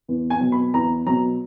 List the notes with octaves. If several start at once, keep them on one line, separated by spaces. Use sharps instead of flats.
E2
G#5
B2 F#3
B5
E2 A#5
B2 F#3 A#5